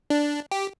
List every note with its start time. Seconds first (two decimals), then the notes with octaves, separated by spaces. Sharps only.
0.10 D4
0.51 G4